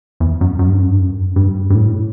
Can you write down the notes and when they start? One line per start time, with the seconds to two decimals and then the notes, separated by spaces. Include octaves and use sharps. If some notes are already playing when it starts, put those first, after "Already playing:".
0.20 E2
0.41 F#2
0.59 F#2
0.69 G2
0.79 F#2
0.89 G2
0.99 F#2
1.36 G2
1.70 G2
1.75 A2